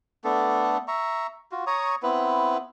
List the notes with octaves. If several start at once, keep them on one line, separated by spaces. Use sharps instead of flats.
A3 B3 D4 A4
E5 A#5 C#6
F4 F#4
C#5 A#5 C#6 D#6
B3 C4 E4 B4